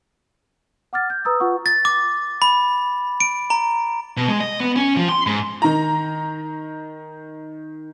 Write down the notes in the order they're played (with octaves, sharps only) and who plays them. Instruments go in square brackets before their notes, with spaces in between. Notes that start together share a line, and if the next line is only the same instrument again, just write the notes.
[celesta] F#5 D6 F6 A6
G6
B4 A#5 D#6 E6
F4 B4 F#5 C#6
[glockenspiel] A6
D6
B5
D7
A#5
[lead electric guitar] B2
G#3
D#5
B3
C#4
F3
C6
G#2
[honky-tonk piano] D#3 A#5